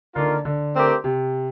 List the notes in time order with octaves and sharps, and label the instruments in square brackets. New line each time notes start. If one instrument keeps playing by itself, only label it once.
[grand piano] D3 [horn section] D#3 A#3 F4 A#4
[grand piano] D3
[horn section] A3 C4 G4 A#4
[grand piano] C3